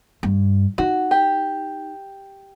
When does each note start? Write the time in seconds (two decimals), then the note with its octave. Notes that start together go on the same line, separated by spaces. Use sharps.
0.23 G2
0.78 D#4 F#4
1.11 G4